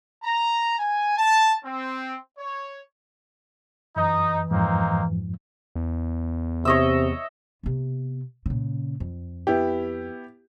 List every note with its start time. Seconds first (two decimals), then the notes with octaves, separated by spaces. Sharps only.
0.23 A#5
0.78 G#5
1.16 A5
1.64 C4
2.38 C#5
3.96 F#2 E3 D#4
4.51 F2 G#2 F3 A#3 C4 D#4
5.76 E2
6.65 C3 C#5 D#5 E5
7.63 C3 B3
8.46 A#2 C#3
9.00 F2
9.47 B3 E4 G4